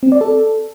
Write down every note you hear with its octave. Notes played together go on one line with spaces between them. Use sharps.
C4
D5
A4